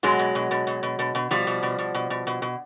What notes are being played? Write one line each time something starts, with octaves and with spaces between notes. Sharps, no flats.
B2 F#3 G#3
B2
B2
B2
B2
B2
B2
B2
B2 F3 G3
B2
B2
B2
B2
B2
B2
B2